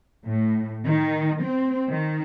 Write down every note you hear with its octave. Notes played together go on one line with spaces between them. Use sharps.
A2
D#3
C4
D#3